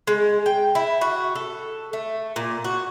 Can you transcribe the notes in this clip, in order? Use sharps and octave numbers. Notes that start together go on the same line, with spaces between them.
G#3
G5
E4
F#4
A4
A3
A#2
F#4